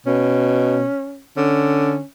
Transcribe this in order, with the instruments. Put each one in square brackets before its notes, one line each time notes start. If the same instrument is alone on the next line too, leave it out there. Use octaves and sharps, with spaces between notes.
[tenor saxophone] B2 [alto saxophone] C#4
[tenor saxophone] D3 [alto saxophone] C#4